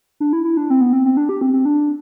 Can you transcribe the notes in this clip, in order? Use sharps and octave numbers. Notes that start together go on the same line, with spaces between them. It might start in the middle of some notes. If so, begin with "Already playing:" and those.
D4
E4
E4
D4
C4
B3
C4
C4
D4
G4
C4
C4
D4